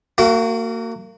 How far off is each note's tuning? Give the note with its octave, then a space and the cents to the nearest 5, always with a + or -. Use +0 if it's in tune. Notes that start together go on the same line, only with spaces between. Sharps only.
A#3 -30 F#4 +10 G5 -30